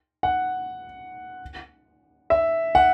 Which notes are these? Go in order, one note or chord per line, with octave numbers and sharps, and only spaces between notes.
F#5
E5
F#5